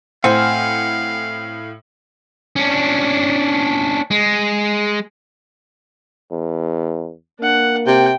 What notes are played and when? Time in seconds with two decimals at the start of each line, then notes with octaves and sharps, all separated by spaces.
0.24 A2 C4 F5 F#5 G#5 F6
2.56 C#4 D4
4.11 G#3
6.31 E2
7.40 A#3 D4 F#5
7.87 C3 G5